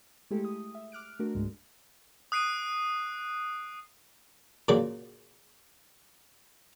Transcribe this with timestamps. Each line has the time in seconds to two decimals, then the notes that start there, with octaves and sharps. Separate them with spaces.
0.31 G#3 A3 E4 G4 A4
0.44 D#6
0.75 E5
0.92 D6 F6 F#6 D7
1.20 A3 D4 F#4 A#4
1.35 C#2 G#2 G#3
2.32 D#6 F#6 C7 D7 D#7
4.68 A#2 C#3 F#3